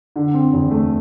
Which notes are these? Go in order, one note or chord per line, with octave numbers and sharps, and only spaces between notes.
D3
C4
E2
A3